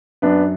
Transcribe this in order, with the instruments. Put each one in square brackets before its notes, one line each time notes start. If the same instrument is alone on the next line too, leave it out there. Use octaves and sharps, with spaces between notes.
[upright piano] F#2 B3 D4